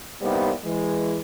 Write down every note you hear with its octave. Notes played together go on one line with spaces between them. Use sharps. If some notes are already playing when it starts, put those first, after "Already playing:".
C2 G3 A#3 B3 D#4 C5
E3 G#3